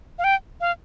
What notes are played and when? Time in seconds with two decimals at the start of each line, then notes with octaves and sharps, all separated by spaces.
0.19 F5
0.24 G5
0.60 F5